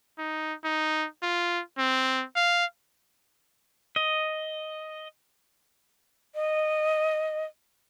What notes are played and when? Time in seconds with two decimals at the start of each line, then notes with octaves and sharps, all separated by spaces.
0.18 D#4
0.64 D#4
1.23 F4
1.78 C4
2.36 F5
3.96 D#5
6.35 D#5